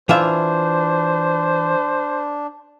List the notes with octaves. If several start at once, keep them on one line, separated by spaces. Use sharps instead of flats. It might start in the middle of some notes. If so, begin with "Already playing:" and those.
E3 D4 F4 C5 E5